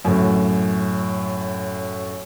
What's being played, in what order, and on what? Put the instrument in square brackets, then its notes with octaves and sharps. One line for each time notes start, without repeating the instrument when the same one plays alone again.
[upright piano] F#2 A2